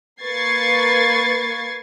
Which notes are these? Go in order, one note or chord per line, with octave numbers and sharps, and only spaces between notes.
A#3 B4 C#6 G#6 A6 C7